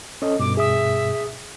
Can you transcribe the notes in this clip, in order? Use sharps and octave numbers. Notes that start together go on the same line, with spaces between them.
C#4 A4 D#5
G2 B2 D6
G#4 E5 D#6